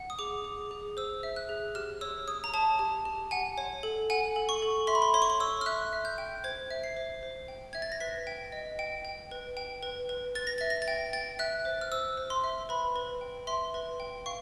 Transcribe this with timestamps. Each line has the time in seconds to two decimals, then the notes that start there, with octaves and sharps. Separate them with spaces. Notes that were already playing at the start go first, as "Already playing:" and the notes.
Already playing: F#5
0.10 D#6
0.19 G#4 D6
0.44 G#4
0.71 G#4
0.97 C5 E6
1.23 E5
1.36 F#6
1.49 G#4
1.75 G4 F6
2.01 C#5 E6
2.28 C#5 D#6
2.44 A#5
2.54 C#5 A5
2.79 G4
3.05 G4
3.31 F#5 G#5
3.58 C#5
3.83 A4
4.10 F#5 G#5
4.36 A4
4.49 C#6
4.62 A4
4.87 E5 C6
4.95 B5
5.02 C6
5.14 C#5 C6
5.22 C#6
5.30 C6
5.40 C#5 E6
5.61 F6
5.66 E5 F#6
5.93 E5
6.05 G6
6.18 G5
6.44 C5 G#6
6.71 E5
6.84 C7
6.97 C5
7.23 C5
7.48 G5
7.73 E5 G#6
7.82 A6
7.92 A#6
8.00 B4 B6
8.27 G5
8.52 D#5
8.79 G5
9.05 G5
9.31 B4
9.57 G5
9.83 B4
10.09 B4
10.35 B4 A6
10.47 A#6
10.58 E5 A6
10.70 A#6
10.82 A6
10.88 G5
11.13 G5 A6
11.39 E5 F#6
11.65 C5
11.81 F6
11.92 C5 E6
12.17 C5
12.30 C6
12.44 E5
12.69 B4 B5
12.96 B4
13.21 G5
13.47 E5 C6
13.74 B4
14.00 G5
14.26 F5 C#6